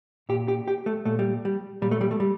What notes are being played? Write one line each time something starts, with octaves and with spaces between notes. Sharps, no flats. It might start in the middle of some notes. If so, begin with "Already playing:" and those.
A#2 G4
G4
G4
A3
A#2 A3
G3
G3
A#2 G3
A3
G3
A3
G3